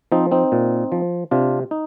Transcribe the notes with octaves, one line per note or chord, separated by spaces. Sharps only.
F3 C4 D#4
C4 D#4
A#2
F3
C3 D4 F4
D#4